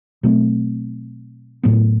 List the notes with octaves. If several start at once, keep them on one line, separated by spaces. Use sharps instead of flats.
B2 F#3 A3 C4
A2 F#3 B3